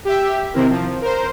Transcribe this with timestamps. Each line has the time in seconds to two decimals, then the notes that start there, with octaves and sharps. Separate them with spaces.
0.05 G4 E5
0.54 C3 D#3 C4 E4 A#4
0.70 F3
1.01 A#4 C5